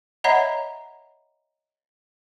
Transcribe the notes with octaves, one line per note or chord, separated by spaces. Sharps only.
C#5 D#5 E5 F#5 A#5 B5